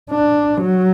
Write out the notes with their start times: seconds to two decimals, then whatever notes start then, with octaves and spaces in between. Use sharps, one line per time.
0.11 D4
0.61 F#3